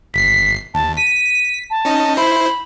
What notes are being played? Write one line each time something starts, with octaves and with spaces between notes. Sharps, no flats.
G1 B6 C7
D#2 A5
B6 D#7
A5
C#4 D#4 D#5
E4 C5 B5